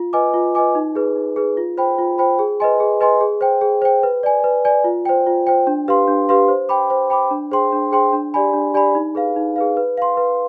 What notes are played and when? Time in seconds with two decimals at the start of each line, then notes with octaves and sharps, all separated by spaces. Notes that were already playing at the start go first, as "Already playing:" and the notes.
Already playing: F4
0.13 B4 D#5 G#5 D6
0.34 F4
0.55 B4 D#5 G#5 D6
0.75 D#4
0.95 G#4 B4
1.16 D#4
1.36 G#4 B4
1.57 F4
1.78 C5 G5 B5
1.98 F4
2.18 C5 G5 B5
2.39 G#4
2.60 B4 D#5 G#5 C6
2.80 G#4
3.01 B4 D#5 G#5 C6
3.21 G#4
3.41 C5 G5
3.61 G#4
3.82 C5 G5
4.03 B4
4.23 D5 G#5
4.44 B4
4.65 D5 G#5
4.84 F4
5.05 C5 G5
5.26 F4
5.47 C5 G5
5.67 D4
5.88 G4 B4 F5 C6
6.08 D4
6.29 G4 B4 F5 C6
6.48 C5
6.69 G5 B5 D6
6.90 C5
7.10 G5 B5 D6
7.31 D4
7.51 G#4 C5 G5 C6
7.72 D4
7.92 G#4 C5 G5 C6
8.13 D4
8.34 G4 D5 G#5 B5
8.53 D4
8.74 G4 D5 G#5 B5
8.95 D#4
9.15 G#4 B4 F5
9.36 D#4
9.56 G#4 B4 F5
9.77 B4
9.97 F5 C6
10.17 B4